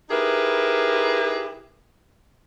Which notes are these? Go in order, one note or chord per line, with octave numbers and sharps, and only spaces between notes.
D#4 E4 G4 G#4 A#4 B4